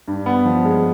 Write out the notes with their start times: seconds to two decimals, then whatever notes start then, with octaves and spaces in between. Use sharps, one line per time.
0.08 G2
0.26 B3
0.46 F3
0.65 G#3